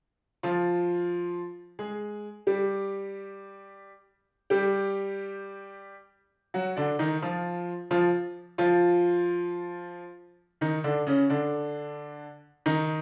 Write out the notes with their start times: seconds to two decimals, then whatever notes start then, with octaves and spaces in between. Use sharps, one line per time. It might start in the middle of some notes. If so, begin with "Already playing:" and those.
0.43 F3 F4
1.79 G#3 G#4
2.47 G3 G4
4.50 G3 G4
6.54 F#3 F#4
6.76 D3 D4
6.99 D#3 D#4
7.22 F3 F4
7.91 F3 F4
8.58 F3 F4
10.61 D#3 D#4
10.84 D3 D4
11.07 C#3 C#4
11.30 D3 D4
12.66 D#3 D#4